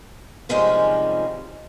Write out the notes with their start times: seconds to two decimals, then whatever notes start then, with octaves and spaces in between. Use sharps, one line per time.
0.49 C3 D#3 F3 G3 G#3 C#4